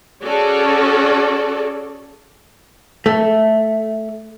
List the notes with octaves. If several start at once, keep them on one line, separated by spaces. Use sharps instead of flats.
C#4 F#4 G#4 A4 D5
A3